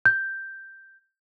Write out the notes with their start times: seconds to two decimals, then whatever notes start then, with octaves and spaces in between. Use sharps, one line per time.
0.06 G6